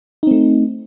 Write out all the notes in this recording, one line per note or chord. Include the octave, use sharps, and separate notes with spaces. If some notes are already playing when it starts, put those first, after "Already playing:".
A3 C4 D#4